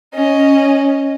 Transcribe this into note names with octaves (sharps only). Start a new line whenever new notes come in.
C#4 D#5